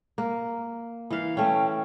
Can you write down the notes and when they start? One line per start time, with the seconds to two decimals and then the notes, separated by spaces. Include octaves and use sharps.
0.18 A#3
1.10 E3 F5
1.37 A3 C#4 G5